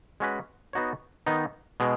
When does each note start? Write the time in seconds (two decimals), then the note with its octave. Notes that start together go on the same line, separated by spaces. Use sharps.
0.20 G#3 C#4 F#4 B4
0.73 B3 D#4 F#4 C#5
1.26 D#3 B3 D#4
1.80 B2 G#3